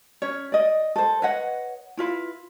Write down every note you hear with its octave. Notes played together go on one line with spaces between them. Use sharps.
C#4 C#5
D5 D#5
A4 C5
B4 C#5 D#5 F#5
E4 F4 B4